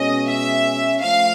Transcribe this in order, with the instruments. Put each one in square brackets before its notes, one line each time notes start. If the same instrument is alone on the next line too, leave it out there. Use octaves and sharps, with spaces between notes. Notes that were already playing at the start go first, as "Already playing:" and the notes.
Already playing: [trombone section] B2 G#3 C#4 [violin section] D#5
[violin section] E5
[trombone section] F3 A3 [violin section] F5